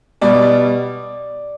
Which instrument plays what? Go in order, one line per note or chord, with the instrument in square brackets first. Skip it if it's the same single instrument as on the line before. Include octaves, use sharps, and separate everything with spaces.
[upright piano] B2 G3 D5